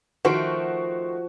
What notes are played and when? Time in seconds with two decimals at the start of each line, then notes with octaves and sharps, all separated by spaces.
0.25 D#3 F3 A3 F#4 C5 D7